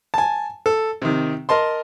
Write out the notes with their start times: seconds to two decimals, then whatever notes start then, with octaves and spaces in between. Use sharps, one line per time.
0.14 G#5 A5
0.66 A4
1.02 C3 D#3
1.49 A#4 D#5 A5 C6